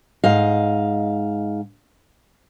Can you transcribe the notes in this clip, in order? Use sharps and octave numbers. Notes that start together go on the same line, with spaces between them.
G#2 D#5 F5